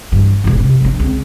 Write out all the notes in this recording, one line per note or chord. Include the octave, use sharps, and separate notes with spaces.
G2 E3
E1 A1
C3
F3 D4
C#2 C4